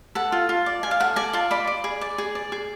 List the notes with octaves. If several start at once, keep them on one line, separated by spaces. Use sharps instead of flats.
A4 F#5
F4
F4
D5
F4 G#5
F5
A4 F#5
D5 G#5
F4 A5
D5 B5
D5
G#4
D5
G#4
D5
G#4